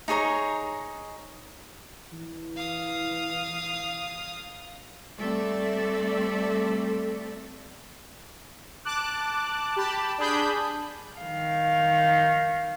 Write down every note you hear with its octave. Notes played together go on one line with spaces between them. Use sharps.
D#4 G#4 C#5 A#5
E3
F5 D#6
G3 A3 C4 A4 D5 E5
A5 D6 F#6
G4 A5 B5
D4 G#4 B5 G6
D#3 F5